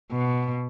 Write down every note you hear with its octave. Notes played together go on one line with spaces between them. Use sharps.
B2